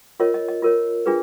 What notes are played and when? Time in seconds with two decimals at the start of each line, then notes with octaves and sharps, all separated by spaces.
0.20 F4 A#4 C#5 D#5
0.34 D#5
0.48 D#5
0.62 F4 A#4 C#5
1.06 D4 F4 G#4 B4